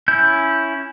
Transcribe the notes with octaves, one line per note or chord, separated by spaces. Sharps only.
C#4 E4 G6